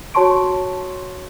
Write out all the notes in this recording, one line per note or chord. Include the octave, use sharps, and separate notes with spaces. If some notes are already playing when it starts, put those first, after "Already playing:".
F#4 C#5 A5 C6 C#6 D7